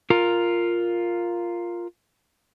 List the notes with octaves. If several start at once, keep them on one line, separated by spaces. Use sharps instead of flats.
F4 A#4